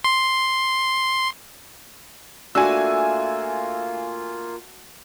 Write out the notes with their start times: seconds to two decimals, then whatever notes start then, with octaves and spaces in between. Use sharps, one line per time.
0.04 C6
2.55 A3 A#3 D4 F4 F#4 G#5 E6